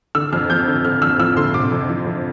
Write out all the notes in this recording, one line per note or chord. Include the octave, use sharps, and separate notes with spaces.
D3 E6
F2 F6
F2 G6
D3
D3 F6
F2 E6
F3 E6
D3 C6
C3 D6
F2
F3
F2